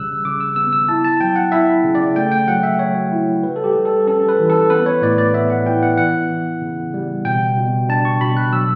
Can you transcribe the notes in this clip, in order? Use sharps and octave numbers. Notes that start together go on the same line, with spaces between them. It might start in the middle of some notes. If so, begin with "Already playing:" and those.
Already playing: C#3 G3 E6 F#6
C#3 D6
E6
B3 E6
E6
E4 A5
A5
F#3 G5
F#5
E4 E5
C#3
D5
A3 G5
G5
F#3 F#5
E5
F#3 C#5
E4
G3 B4
A4
G4
G3
A4
C#4 A4
B4
E3
A4
B3 B4
C#5
A2 D5
D5
B3 E5
F#5
E4 G5
F#5
E3 F#5
E3
C#3
G3
B2 G5
B2
D4 A5
C#6
B2 B5
F#6
F#3 E6